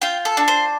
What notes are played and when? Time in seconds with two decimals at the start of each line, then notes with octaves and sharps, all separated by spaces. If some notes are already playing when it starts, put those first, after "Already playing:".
0.02 F4 G5
0.25 A4
0.37 D4
0.48 C5